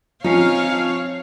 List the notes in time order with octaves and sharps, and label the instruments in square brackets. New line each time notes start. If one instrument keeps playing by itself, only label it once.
[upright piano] F3 [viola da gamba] C4 C#5 [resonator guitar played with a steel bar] C#4 D#4 [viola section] F5